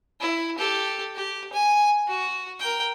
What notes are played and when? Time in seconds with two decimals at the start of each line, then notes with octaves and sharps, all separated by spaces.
0.20 E4
0.58 G4 A4
1.15 G4
1.53 G#5
2.08 F#4
2.59 A#4 G5